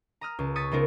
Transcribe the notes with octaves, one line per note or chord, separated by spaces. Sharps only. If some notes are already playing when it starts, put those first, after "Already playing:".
A#5 D#6 F6
C#2
C#6 D#6 G#6 A6 B6
C#3 B3 D#4 F4 A#4 C5